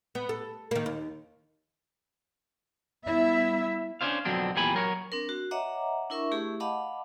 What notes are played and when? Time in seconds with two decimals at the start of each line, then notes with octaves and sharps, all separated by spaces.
0.15 B3
0.29 A4
0.71 D#3 A#3
0.86 D#2
3.06 G3 B3 E4 E5
4.01 C#4 D4 E4 C5 F5
4.25 F2 B2 D3 F#3 C4 D4
4.56 E2 A#2 G4 G#5 B5
4.74 F#3 A#4 C#5
5.12 C4 D4 A#4
5.29 F#4
5.51 C#5 D#5 E5 F#5 A#5 D6
6.10 D4 E4 A#4 E5 C#6
6.31 A3 E4 G4 G#4
6.60 D#5 F5 F#5 A5 B5 D6